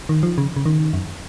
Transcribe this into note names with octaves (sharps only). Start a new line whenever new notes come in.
D#3
F3
C#3
C#3
D#3
F#2